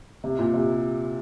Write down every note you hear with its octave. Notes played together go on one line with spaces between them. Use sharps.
C3
A#2
C3